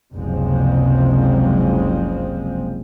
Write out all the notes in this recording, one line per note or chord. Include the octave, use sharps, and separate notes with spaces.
F#1 C#2 C3 F3 G#3 C4